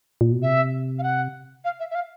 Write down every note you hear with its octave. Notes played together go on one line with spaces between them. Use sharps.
A#2
B2
C3 E5
F5
F#5
F5
E5
E5
F5